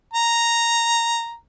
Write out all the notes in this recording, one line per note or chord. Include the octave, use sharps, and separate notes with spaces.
A#5